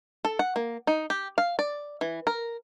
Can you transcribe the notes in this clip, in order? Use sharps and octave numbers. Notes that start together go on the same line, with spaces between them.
A4
F#5
A#3
D#4
G4
F5
D5
E3
A#4